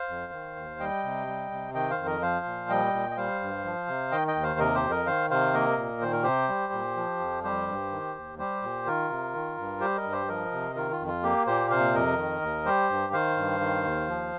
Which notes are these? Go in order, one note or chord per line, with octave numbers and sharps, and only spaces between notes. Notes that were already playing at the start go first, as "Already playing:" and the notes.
Already playing: C5 F5
F2
D#3
D#2
G3 D#5 G5
C3
G3
C3
D#3 D#5 G5
C5 F5
F2
A#4 D#5
F3 C5 F5
A#2
G3 D#5 G5
A#2
D#5
G3 C5 F5
G2
F3
C3
D#3 D#5 G5
D#5 G5
D#2
C5 F5
C3 A#4 D#5
G4 C5
F2
A#4 D#5
D#3 C5 F5
C3 C5 F5
A#3 A#4 D#5
A#2
D#3 C5
A#4
C3 G4 C5
G3
A#2
F3
F2
G3 G4 C5
G2
D#3
D#2
G3 G4 C5
A#2
D#3 F4 A#4
C3
D#3
G2
G3 G4 C5
A#4 D#5
G2
G4 C5
F3 A#4 D#5
C3
D#3 F4 A#4
F4
F2
F4
A#3 G4
A#2 G4 C5
C3 C5 F5
F2 A#4 D#5
D#3
D#2
G3 G4 C5
G2
D#3 C5 F5
G2
D#3
D#2
F3